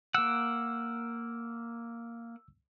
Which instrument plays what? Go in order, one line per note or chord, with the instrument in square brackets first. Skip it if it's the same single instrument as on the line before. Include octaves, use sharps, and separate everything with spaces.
[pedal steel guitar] A#3 F#5 [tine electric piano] E6